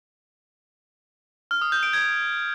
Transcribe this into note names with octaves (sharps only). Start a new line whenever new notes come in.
F6
D#6
G6
D7
G#6